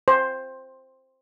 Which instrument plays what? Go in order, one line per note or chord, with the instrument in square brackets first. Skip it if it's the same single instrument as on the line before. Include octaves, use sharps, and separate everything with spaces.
[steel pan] C5